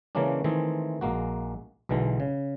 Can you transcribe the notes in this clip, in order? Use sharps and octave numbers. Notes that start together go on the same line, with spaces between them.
C#3 E3 G#3 A#3 C#4 D4
D#3 E3 G#3 A3 C4 G#4
A#1 G#3 A#3 F#4
B1 B2 D3 E3 G#3
C#3